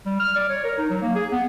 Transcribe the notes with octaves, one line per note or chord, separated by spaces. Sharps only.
G3
F6
D5
C#5
A#4
D#4
F#3
A#3
G#4
B3